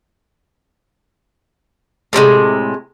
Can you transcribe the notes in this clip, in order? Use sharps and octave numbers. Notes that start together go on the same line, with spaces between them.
A2 C3 G3 G#3